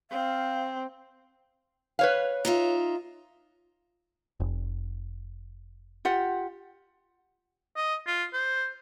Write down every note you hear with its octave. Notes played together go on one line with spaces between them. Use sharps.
C4 F5
B4 C#5 F5
D#4 F4 E5
F1
F4 G4 F#5
D#5
F4
C5